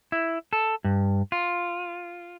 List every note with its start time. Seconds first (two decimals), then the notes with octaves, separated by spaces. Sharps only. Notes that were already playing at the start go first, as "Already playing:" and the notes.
0.12 E4
0.53 A4
0.84 G2
1.32 F4